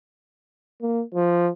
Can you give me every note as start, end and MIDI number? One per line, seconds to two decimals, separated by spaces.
0.81 1.02 58
1.15 1.49 53